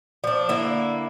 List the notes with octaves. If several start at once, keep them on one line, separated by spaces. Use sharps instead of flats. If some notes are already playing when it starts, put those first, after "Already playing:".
F3 D4 D5
D3 A#3 E4